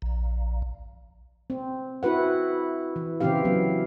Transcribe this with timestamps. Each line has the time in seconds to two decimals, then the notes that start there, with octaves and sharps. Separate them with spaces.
0.02 A#1
1.50 C4
2.03 E4 F#4 B4 F#5
2.96 E3
3.21 C#3 E3 C4 E4 G4 F5
3.45 F#3 B3